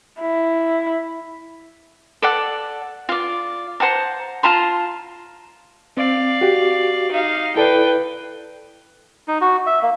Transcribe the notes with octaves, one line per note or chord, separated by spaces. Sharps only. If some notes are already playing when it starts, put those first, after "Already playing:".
E4
A4 D5 F#5
F4 D5
C5 F#5 A5 A#5
F4 A5 A#5 C6
C4 D5 F5
F#4 G4
D#4 F5
E4 A4 B4 D5 G5
D#4
F#4
E5
A#3